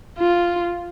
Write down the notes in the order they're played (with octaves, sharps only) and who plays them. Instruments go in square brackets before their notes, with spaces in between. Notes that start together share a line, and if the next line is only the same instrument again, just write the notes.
[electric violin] F4